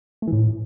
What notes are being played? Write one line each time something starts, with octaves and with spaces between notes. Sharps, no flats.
A3
E3
A2